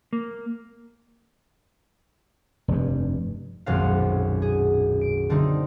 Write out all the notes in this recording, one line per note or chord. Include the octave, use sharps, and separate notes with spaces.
A#3
F1 G2
D#1 B1 F#2 G#3 C4 F5
G#4
D7
D3 G3 A3 A#3 C4 D#4